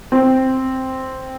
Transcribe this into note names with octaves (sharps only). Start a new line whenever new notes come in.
C4